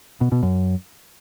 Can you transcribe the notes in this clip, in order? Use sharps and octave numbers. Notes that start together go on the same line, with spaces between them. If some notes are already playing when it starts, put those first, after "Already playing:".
B2
B2
F#2